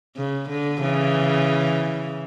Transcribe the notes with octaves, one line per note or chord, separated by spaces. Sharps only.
C#3
D3
C#3 E3